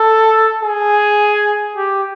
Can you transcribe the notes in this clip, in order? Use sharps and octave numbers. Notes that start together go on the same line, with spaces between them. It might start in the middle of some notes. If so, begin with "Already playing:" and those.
Already playing: A4
G#4
G4